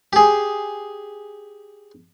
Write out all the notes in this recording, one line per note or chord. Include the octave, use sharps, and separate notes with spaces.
G4 G#4